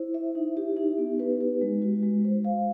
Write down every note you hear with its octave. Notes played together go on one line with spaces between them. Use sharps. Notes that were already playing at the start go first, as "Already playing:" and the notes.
Already playing: E4 C5
E5
D#4
G4
D#4
B3
B4
B4
G#3
F#4
G#3
C5
F5